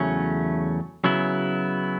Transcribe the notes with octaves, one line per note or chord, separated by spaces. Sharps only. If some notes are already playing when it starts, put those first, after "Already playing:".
Already playing: E2 C#3 F#3 A3 C#4
C#3 F#3 B3 E4